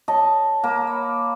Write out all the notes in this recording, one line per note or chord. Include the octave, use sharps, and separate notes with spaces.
C#5 D#5 A5
A#3
C#5 B5